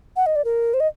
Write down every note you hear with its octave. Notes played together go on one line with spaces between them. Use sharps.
F#5
D#5
D5
A#4
C5
D#5